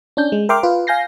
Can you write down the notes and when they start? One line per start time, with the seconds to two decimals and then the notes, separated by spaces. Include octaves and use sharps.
0.17 C#4 D4 G6
0.32 G#3
0.49 A#4 E5 G5 C6 D6 F6
0.63 F4 B4
0.87 F5 G#5 G6 A#6 C7